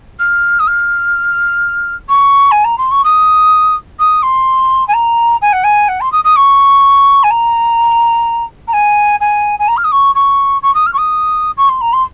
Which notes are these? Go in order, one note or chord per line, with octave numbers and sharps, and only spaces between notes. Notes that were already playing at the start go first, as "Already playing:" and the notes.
F6
D#6
F6
C#6
G#5
A#5
C6
C#6
D#6
D#6
C6
G#5
A#5
G#5
F#5
G#5
F#5
C6
D#6
D#6
C#6
G#5
A#5
A#5
G#5
G#5
G#5
A#5
F6
D#6
C#6
C#6
C#6
D#6
F6
C#6
D#6
C#6
C6
A#5
C6